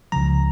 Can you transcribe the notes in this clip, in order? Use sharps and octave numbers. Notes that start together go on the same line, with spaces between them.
C#2 C#3 F3 A#5